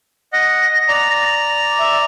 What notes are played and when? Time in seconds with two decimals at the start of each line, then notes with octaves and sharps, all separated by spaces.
0.33 D#5 F#5 A#6
0.88 D5 A#5
1.78 E5